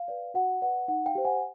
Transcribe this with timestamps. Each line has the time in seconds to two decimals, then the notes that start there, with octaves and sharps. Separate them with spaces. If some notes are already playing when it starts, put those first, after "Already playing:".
Already playing: F5
0.08 B4 D5
0.34 F#4 F#5
0.61 B4 D5 F#5
0.88 D#4 F#5
1.06 F5 G5
1.15 G4 C5
1.25 F#5 G#5